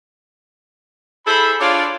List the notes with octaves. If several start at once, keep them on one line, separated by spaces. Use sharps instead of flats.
E4 G#4 A4 C5 B5
D4 F4 C#5 D5